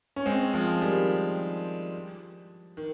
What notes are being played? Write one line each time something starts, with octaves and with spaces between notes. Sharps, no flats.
C#4
G#3 C4
F3 G#3
D#3 G3
D#3